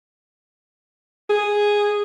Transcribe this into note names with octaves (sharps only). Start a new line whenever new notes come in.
G#4